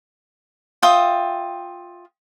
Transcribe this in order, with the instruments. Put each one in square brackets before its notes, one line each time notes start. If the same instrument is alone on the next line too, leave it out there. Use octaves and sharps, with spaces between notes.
[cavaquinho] F4 E5 G5 D#6